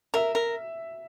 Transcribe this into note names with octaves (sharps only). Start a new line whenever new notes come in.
A#4 E5
A#4